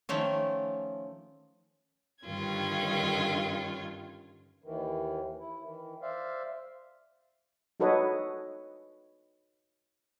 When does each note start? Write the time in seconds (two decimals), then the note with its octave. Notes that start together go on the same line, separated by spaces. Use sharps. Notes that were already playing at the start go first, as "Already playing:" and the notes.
0.09 D#3 F3 A3 C#4
2.24 G2 D3 D#3 C#4 F4 G#6
4.64 D#2 D#3 E3
5.40 E4
5.63 D#3 E3
6.02 C5 D5 E5 F5
7.80 D#4 F#4 A4 B4 C#5 D#5